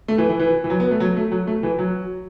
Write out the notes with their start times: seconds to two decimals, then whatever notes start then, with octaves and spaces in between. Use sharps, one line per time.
0.08 A3
0.18 E3
0.29 E3
0.39 E3
0.64 E3
0.70 F#3
0.80 B3
0.91 A3
1.00 F#3
1.17 A3
1.32 F#3
1.47 A3
1.63 E3
1.79 F#3